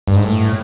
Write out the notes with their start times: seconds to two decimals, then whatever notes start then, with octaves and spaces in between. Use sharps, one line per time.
0.07 G2
0.16 G#2
0.24 A2